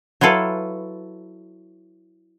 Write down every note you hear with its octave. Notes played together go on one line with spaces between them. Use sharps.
F#3 E4 F4 A4 B4